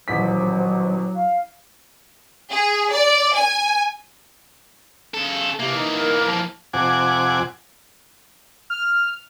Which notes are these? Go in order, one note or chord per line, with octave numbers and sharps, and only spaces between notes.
D#1 A1 F#3 C5 B6
F5
G#4
D5
G#5
C#3 A4
C3 E3 A#3
D#4
A#4
F3
F2 C3 F#5 G#5 D6
F6